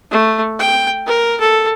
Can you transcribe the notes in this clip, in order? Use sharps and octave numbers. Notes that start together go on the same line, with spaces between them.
A3
G5
A#4
A4